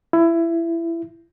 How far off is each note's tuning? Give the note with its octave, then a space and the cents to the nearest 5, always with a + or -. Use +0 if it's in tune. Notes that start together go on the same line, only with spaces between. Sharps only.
E4 +20